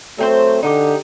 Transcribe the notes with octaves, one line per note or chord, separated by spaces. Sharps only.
F#3 A3 C4 C5
D3 D#4 F#4 G4